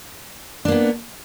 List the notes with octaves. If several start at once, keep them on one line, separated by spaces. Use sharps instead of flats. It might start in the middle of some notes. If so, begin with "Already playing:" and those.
A#3 B3 D4